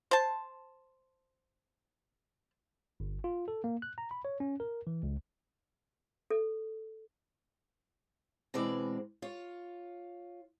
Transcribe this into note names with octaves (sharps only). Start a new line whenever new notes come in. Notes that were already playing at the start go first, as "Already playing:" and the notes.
C5 A5
G1
F4
A4
A#3
F#6
A#5
B5
C#5
C#4
A#4
E3
C#2
A4
B2 E3 G#3 C4 D5
F4 C#5